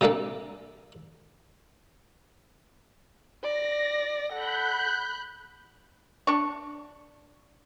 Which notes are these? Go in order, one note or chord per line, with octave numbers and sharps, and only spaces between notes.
C3 G3 A#3 D4 A4
D5 A#6
A4 F#5 B5 F#6 G6
D4 C#6